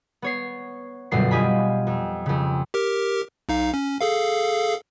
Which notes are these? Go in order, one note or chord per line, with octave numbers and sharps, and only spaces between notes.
B3 C#5 C7
G1 F#2 B2 C7
F4 G4 D#5 G#5 B5
F2
F2 C#3
G4 A#4
B1 D#4 F5
C#4
G#4 A4 F5